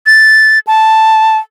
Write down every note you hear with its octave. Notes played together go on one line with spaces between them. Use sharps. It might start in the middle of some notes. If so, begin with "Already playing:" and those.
A6
A5